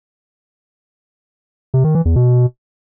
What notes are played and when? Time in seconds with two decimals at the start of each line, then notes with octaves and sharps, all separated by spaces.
1.74 C3
1.84 D#3
1.95 E3
2.05 E2
2.16 B2